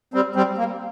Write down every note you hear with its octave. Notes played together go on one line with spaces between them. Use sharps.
G3 C4
G3 C4
A#3